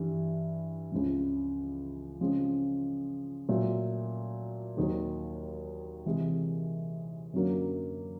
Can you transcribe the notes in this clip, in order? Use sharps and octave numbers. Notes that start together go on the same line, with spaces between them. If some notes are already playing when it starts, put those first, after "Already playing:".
Already playing: G2 E3 G3
C#2 C#3 F3
C#3 F3 G#3
A#2 F#3 A3
D#2 D#3 F#3
C3 E3 G#3
F#2 D3 F#3 A#3